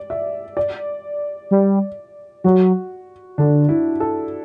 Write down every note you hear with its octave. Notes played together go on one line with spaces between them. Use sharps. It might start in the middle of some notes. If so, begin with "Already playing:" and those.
Already playing: D5
E5
D5
G3
F#3 F#4
D3 D4
E4
A4